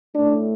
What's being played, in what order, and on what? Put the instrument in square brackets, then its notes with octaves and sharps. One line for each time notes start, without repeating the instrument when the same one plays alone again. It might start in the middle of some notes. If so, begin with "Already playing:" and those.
[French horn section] A2 A3 D4